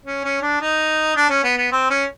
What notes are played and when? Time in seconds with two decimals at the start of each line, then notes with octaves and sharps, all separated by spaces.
0.06 C#4
0.24 C#4
0.42 D4
0.61 D#4
1.16 D4
1.30 C#4
1.44 B3
1.57 B3
1.72 C4
1.90 C#4